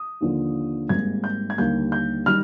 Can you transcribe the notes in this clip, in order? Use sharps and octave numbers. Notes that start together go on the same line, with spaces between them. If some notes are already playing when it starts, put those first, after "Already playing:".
Already playing: D#6
D#2 D3 F3 A#3
G#1 G#2 G3 A#3 G#6
G6
G#6
D#2 D3 G3 A#3 G6
G6
D#3 G3 F6